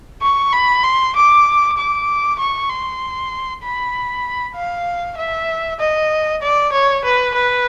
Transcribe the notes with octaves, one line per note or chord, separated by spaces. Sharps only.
C#6
B5
C6
D6
D6
C#6
C6
B5
F5
E5
D#5
D5
C#5
B4
B4